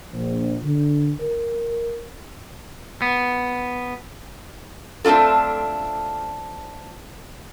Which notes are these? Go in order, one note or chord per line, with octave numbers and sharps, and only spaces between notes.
A#1
D3
A#4
B3
A3 C4 D4 F4 A4